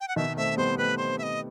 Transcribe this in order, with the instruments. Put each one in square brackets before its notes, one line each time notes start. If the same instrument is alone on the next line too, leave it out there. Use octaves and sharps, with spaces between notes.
[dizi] G5
F#5
[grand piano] B2 D#3 [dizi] E5
[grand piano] A3 C4 [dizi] E5
[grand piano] G3 B3 [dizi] C5
[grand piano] A3 C4 [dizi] B4
[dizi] C5
E5
D#5